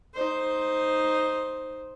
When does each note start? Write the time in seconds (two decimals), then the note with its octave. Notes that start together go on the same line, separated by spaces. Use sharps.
0.14 D#4 C5